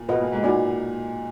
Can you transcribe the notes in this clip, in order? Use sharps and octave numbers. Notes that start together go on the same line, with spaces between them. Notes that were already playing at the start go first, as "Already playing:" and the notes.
Already playing: A#2
B2 F4 B4 D#5 F#5
A#2
G#2
A#2 D#4 F#4 D5 G#5 B5